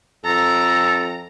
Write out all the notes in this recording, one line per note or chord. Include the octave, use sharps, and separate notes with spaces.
F2 A4 A#5